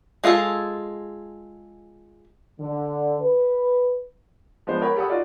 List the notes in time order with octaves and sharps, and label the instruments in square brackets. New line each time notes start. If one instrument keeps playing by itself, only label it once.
[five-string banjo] G#3 F4 G#4 A4
[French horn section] D3
B4
[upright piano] F3 G#3 B3 D4 C5
A#4 C#5 F#5 G5 B5
G4 A4 C#5 F#5 B5 D#6
D#4 F4 F#4 D5